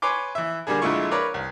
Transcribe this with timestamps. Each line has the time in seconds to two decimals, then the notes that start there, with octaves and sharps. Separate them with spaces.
0.02 B4 C#5 G#5 C6 D6
0.35 E3 E5
0.67 D3 G3 A#3 D4 G#4
0.82 A#1 D3 G#3 E4 F4 C#6
1.11 A#4 B4 C#5 D5
1.34 C2